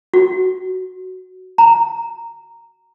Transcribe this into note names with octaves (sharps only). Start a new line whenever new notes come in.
F#4
A#5